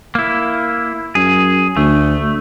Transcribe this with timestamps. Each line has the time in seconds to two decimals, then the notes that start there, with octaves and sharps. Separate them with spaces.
0.15 A#3 E4
1.15 F#2 G#4
1.77 D2 A3